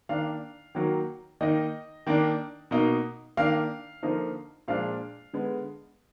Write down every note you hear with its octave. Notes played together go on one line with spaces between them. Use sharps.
D#3 A#3 D4 F5
D#3 F#3 A#3
D#3 A#3 D#4 D#5
D#3 A#3 D4
B2 A#3 D#4
D#3 A#3 D4 F5
D3 F3 A#3 D#4
A#2 F3 G#3 D4 F5
D3 G#3 B3